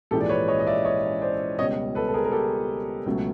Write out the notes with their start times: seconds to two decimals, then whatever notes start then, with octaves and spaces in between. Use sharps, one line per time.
0.11 A#1 G#2 E3 G#3 G4 A4
0.21 D5
0.29 B4 C#5
0.48 C#5 D#5
0.59 D#5
0.67 D5 E5
0.85 C#5 D#5
1.22 C5 D5
1.59 C#2 B2 G3 C#5 D#5
1.95 A4 B4
2.08 A4
2.14 G#4 A#4
2.24 A#4
2.32 G4 A4
3.06 C#2 B2 F#3 A3